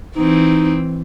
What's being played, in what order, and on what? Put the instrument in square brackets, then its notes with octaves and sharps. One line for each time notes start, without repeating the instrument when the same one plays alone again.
[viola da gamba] E3 C4 [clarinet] D#4